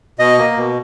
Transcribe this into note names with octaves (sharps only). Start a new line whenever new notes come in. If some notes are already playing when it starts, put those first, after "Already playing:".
B2 D#5
A#3
B2